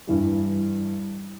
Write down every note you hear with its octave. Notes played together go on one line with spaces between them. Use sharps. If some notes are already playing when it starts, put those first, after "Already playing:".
G2 E3 G3